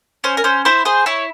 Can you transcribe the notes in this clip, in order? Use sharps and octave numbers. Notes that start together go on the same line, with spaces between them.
C#4 C5
A#4
C#4 C5
E4 C5
G#4 C5
E4 C#5